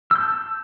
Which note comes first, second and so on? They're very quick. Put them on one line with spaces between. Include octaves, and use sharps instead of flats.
E6 G6 A5